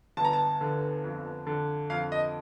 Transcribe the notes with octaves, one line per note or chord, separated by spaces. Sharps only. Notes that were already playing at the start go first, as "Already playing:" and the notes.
G1 A5
A#5
A5
D3
F2
D3
F2 F5
D#5